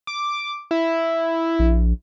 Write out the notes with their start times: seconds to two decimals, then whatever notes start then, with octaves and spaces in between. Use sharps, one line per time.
0.07 D6
0.71 E4
1.59 A#1